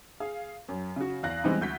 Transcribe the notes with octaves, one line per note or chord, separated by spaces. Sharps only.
G#4 F5
F#2
C#3 F#4
E2 F5 F#6 A#6
E3 G3 G#3 B3 C4 E4
D2 G6 B6